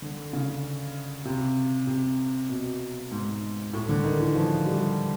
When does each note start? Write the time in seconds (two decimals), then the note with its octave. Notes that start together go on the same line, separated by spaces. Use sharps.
0.02 D3
0.33 C#3
1.25 C3
1.87 C3
2.49 B2
3.11 G#2
3.73 A2
3.89 D3
4.04 D#3
4.19 E3
4.36 F3
4.66 G3